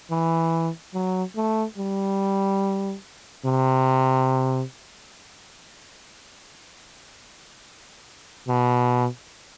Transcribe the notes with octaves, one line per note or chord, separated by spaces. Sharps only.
E3
F#3
A3
G3
C3
B2